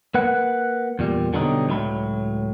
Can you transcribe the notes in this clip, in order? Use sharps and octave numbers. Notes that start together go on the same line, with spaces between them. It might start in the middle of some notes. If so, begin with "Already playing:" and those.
A#3 B4 F#5
E2 A#2 G3
B2 D3 F#3 G3 C4 D#4
C#2 A2 F#3 B5